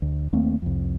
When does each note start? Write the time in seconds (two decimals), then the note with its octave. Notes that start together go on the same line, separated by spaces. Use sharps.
0.02 D2
0.33 D#2 A3 A#3 C4
0.62 C2 F2